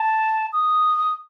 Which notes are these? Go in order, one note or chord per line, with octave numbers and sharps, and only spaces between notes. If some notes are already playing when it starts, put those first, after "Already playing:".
Already playing: A5
D#6